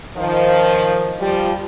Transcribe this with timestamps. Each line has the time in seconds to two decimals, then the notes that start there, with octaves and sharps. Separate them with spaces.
0.17 D#3 F3
1.20 F3 G3